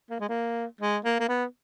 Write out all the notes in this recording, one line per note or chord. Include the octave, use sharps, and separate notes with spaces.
A#3
G#3
A#3
G#3
A#3
A#3
B3